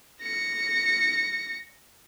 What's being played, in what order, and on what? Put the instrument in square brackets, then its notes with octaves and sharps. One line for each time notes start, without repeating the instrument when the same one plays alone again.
[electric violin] A#6 C#7